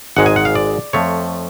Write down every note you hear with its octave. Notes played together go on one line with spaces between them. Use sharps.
G#1 G#2 G#3 F#5
G#5
F#5
F5
D5
F2 F3 A3 C#5